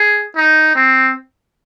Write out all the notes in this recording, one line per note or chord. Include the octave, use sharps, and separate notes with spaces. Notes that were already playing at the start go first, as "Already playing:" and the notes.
Already playing: G#4
D#4
C4